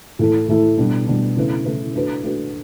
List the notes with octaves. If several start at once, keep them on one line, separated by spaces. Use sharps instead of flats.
A2 E3 A3 E4 A4
A2 E3 A3 E4 A4
B2 G3 B3 D4
B2 G3 B3 D4
C#3 E3 A3 E4 B4
C#3 E3 A3 E4 B4
A3 D4 F#4 B4
A3 D4 F#4 B4